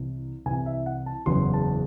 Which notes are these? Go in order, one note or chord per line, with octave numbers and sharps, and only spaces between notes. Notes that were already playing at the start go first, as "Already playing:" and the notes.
Already playing: C2 C3 E3
C2 C3 E3 G#5
E5
F#5
A5
F#1 E2 C#3 F#3 C6
A5